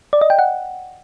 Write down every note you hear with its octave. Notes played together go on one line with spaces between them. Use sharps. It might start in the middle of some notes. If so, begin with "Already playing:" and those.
D5
D#5
G5
F#5